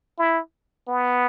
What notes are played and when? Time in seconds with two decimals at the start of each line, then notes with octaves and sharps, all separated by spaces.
0.18 E4
0.88 B3